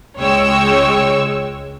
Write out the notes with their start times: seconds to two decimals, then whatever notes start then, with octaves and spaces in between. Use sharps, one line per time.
0.18 C#2 G#3 C#5 G5 C#6 E6